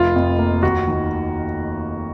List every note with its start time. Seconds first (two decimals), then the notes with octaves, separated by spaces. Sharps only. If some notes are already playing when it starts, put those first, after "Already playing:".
Already playing: F1 F4
0.16 F2
0.39 A#3
0.63 D#2 F#4
0.87 D#3